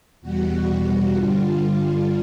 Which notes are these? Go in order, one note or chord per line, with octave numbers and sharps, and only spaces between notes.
E2 B2 G3 F#4
G2 D3 G3 F4